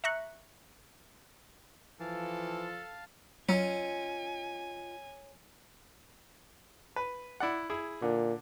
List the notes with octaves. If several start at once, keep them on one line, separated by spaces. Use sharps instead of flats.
E5 A#5 C#6 F#6
E3 F3 A4 F5 A5
F#3 C#4 F4 D#5 G#5
B4
E4 D5 F#5
E4 G#4
A#2 D3